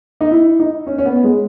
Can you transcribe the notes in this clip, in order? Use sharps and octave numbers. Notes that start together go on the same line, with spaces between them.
D#4
E4
D#4
C#4
C#4
B3
G#3